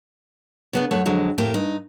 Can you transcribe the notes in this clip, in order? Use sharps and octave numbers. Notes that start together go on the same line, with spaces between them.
C#3 B3 D4
F#2 A3 C#5 F#5
F2 D3 F#3 G#3
F2 A2 A3 A#3 G4
G2 D#4